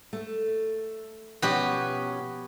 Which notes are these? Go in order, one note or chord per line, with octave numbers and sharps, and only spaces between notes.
A3
B2 F3 B3 C#4 F#4 G4